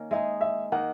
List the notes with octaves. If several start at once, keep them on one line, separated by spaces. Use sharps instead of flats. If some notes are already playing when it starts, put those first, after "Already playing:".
Already playing: D#3 A#3 C#4
G#3 D#4 G#4 E5
E5
D#3 A#3 D#4 F#5